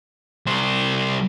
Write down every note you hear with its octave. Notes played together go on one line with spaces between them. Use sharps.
C2 C5